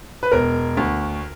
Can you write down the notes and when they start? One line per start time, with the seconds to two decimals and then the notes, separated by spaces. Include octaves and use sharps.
0.23 B4
0.32 E1 A#4
0.77 D2